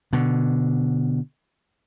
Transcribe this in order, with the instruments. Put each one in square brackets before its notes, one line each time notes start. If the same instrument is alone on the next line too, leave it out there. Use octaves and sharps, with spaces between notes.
[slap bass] B2 D3